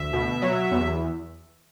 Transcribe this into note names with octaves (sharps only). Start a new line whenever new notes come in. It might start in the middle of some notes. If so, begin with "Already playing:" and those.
Already playing: D2 E5
B2
F#3
E2